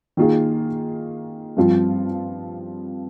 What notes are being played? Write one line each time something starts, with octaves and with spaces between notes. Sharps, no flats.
D#3 A#3 F4 G#4
G2 F3 C4 F4